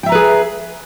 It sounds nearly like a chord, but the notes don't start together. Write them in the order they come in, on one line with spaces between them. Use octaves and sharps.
G5 E5 A#5 B4 G#4